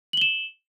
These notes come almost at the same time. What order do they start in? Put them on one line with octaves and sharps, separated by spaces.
F#7 G7 E7